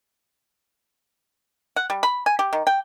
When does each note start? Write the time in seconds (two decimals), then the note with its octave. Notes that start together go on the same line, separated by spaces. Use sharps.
1.76 F#5
1.90 G3
2.03 B5
2.26 G#5
2.39 G4
2.53 D#3
2.67 G5